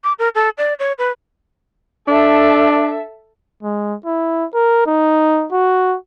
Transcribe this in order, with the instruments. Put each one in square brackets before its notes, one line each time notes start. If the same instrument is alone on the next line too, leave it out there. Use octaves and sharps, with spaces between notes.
[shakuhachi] D6
A#4
A4
D5
C#5
B4
[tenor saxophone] D4 [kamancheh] A4 E5
[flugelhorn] G#3
E4
A#4
D#4
F#4